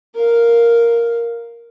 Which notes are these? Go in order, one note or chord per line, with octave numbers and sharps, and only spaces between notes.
A#4 F5